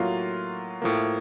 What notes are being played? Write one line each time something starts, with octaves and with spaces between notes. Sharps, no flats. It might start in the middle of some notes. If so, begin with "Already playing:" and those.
Already playing: A2 F#3 A#3 F4 F5
A2 F3 A#3